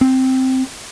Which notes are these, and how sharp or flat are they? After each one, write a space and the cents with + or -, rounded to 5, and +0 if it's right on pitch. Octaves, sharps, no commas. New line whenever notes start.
C4 -5